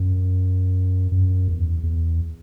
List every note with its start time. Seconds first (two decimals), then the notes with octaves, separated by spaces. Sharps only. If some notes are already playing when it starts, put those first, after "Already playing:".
Already playing: F#2
1.12 F#2
1.48 E2
1.83 E2